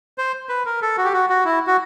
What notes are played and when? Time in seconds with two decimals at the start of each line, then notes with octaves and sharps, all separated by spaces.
0.18 C5
0.49 B4
0.66 A#4
0.82 A4
0.97 F#4
1.05 G4
1.13 F#4
1.30 F#4
1.45 E4
1.67 F#4